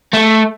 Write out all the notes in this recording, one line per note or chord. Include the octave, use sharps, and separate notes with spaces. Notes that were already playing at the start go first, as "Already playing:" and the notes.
A3